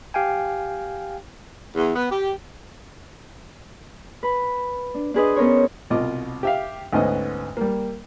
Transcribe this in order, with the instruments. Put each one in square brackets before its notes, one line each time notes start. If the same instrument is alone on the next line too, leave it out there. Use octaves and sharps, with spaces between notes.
[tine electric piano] G4 F5 G5 G#5
[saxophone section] E2
B3
G4
[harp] B4 B5
D4
D4 F#4 G#4 B4 C5 D#5
B3 C#4 A#4 C5 C#5
[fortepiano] C2 B2 F4 D#5 D6
G4 E5 F5
D2 G#2 B3 C#4 C5 D#5
G3 A#3